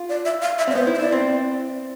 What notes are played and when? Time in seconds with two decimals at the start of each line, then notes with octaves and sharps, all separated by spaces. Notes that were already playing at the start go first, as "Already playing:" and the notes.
Already playing: F4
0.09 D5
0.25 E5
0.42 F5
0.58 E5
0.67 C4
0.70 D5
0.75 B3 C5
0.87 E4
0.95 E5
0.99 E4 D5
1.12 C4